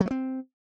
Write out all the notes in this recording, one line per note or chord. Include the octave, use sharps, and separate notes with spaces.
F#3
A3
C4